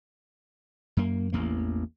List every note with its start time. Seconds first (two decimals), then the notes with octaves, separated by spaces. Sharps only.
0.97 F#2 A#3
1.32 A1 E2 A#3